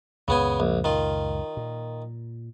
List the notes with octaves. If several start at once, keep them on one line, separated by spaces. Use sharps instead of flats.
C#2 F#2 A#2 C#3 B3 G#5
A#1
D#3 F4
A#2